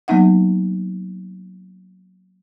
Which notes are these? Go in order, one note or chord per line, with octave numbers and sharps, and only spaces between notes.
F#3 A#3 B3 D#4 E5 F#5